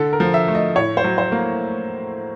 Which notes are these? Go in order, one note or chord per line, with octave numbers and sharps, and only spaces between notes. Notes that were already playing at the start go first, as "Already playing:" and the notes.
Already playing: D3 A4
A#4
F3
E5
A3
D#5
A2 C#5
C5
F#3
C5
A#3